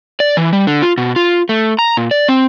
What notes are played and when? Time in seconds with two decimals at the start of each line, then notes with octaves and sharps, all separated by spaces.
0.20 D5
0.37 E3
0.53 G3
0.67 D3
0.82 F4
0.98 B2
1.16 F4
1.49 A3
1.79 A#5
1.97 A#2
2.11 D5
2.28 C4